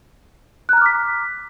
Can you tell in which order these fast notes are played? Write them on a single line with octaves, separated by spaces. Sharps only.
F#6 A#5 F6 D6 B6